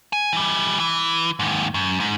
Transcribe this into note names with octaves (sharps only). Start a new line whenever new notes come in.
G#5
E3 G3
E3
D#2 G#2
F#2
G#2